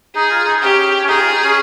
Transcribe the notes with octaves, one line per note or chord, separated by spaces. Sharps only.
D#4 G#4
F4
D#4
C#4 G4
C#4
D#4 G#4
F4
D#4
C#4